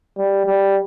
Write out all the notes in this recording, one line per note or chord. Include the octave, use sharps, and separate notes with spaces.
G3
G3